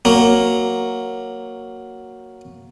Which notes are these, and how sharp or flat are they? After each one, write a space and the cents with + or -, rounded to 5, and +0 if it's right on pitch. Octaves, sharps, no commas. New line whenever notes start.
F#3 +0 A#3 +0